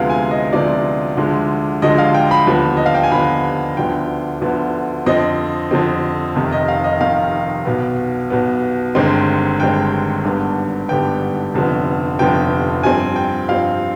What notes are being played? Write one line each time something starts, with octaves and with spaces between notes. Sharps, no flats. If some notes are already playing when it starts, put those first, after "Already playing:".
Already playing: D2 C3 F3 G#3 B3 F5
G#5
D#5
D2 C3 F3 G#3 B3 D5
D2 D3 F3 G#3
D2 D3 F3 G#3 D#5
F5
G5
B5
D#2 D3 F3 B3
D#5
F5
G5
G#5
D#2 D3 F3 B3 B5
D2 D3 F3 B3 G5
D2 D3 F3 B3
F2 D3 F3 C4 D#5
F2 D3 F3 C4
F1 F2 C3 D#3
D#5
F5
D#5
F1 F2 C3 D#3 F5
B1 B2 B3
B1 B2 B3
G1 G2 D#3 G#3 C4
G1 G2 D#3 G#3 C4 G5
G#1 G2 D3 G3 B3
G#1 G2 D3 G3 B3 G5
F1 F2 D3 F3 B3
F1 F2 D3 F3 B3 G5
G2 F3 C4 G#5
G5
G2 F3 C4 F5